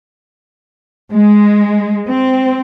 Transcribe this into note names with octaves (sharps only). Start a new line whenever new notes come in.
G#3
C4